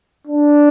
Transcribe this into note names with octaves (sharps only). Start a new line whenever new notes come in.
D4